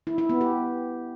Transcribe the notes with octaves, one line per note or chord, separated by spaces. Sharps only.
E4
E4
B3
G4